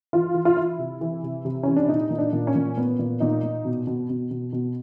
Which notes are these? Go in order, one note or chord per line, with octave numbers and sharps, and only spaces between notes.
E3 F4
E3
F4
E3 E4
C3
E3
C3
C3
E3 C#4
D4
A#2 D#4
A#2
D4
A#2
C#4
A#2
A#2 B3
A#2
A#2 D#4
A#2
B2
B2
B2
B2
B2